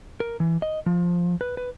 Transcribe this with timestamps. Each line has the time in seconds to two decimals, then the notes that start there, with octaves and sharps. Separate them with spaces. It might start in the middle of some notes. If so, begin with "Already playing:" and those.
0.20 A#4
0.40 E3
0.62 D#5
0.86 F3
1.41 B4
1.57 B4